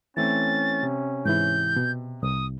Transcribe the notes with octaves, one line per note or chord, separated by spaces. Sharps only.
E3 A3 C4 C#4 A6
C3
G#2 E3 E4 G6
B2
C2 D#6